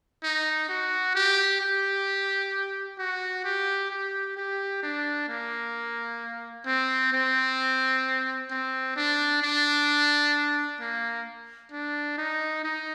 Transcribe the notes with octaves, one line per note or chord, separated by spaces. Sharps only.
D#4
F#4
G4
G4
F#4
G4
G4
G4
D4
A#3
C4
C4
C4
D4
D4
A#3
D4
D#4
D#4